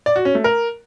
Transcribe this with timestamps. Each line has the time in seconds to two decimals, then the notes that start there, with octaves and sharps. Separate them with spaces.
0.06 D5
0.16 F#4
0.25 C#4
0.35 A3
0.44 A#4